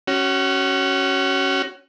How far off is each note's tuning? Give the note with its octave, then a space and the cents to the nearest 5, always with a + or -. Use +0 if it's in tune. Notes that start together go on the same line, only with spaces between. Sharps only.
C#4 +0 F#4 +25